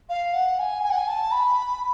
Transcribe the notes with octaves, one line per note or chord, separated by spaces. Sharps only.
F5
F#5
G#5
G#5
F#5
G#5
A5
B5